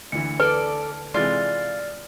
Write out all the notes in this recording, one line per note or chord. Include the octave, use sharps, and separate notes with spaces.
D2 E3 C#7
A4 B4 D5
C3 E3 G#3 F4 D5 F6 A6